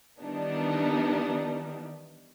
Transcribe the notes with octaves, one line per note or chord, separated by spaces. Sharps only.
D#3 E3 G3 B3 D4 D#4